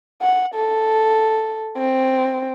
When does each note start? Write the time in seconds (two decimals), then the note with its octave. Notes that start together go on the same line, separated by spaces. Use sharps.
0.21 F#5
0.55 A4
1.77 C4